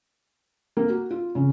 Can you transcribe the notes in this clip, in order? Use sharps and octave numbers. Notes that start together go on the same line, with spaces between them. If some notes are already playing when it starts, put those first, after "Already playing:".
A#3
F#4
F4
C#3